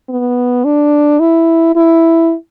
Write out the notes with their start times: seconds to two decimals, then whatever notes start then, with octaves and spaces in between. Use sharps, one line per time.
0.10 B3
0.65 D4
1.20 E4
1.76 E4